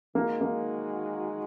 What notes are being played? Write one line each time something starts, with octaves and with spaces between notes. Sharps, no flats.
D#3 G#3 A#3 F#4
A#3